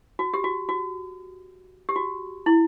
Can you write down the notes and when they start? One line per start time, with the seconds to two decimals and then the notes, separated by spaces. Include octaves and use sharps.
0.19 F#4
0.34 G4
0.44 F#4
0.69 F#4
1.89 G4
1.96 F#4
2.46 E4